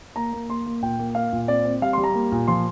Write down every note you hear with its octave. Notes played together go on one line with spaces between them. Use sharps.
A#3 A#5
A#3
A#3 C6
A#3
A#2 G5
A#3
A#3 F5
A#2
C4 D5
C4
G3 F5
C6
G3
A#5
A#3
A#2
F3 C6